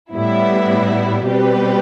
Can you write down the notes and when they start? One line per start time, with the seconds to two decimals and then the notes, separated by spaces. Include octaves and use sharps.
0.13 A2 G3 B3 E4
1.25 B2 G3 C4 G4 B4